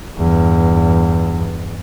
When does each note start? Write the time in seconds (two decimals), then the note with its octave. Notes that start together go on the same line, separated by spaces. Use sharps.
0.17 E2 G2